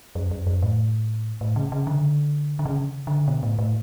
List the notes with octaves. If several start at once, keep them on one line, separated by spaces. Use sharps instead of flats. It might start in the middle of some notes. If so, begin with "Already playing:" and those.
F#2
F#2
F#2
A2
A2
C#3
C#3
D3
D3
C#3
D3
B2
A2
A2